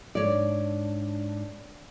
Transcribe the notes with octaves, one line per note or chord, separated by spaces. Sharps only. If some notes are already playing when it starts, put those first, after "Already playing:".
G#2 D4 C#5 D5